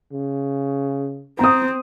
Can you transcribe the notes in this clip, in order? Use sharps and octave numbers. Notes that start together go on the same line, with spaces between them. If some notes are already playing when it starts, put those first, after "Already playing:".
C#3
C4 A#5 D#6